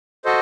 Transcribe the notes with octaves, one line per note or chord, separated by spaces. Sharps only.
F#4 A4 C5 D#5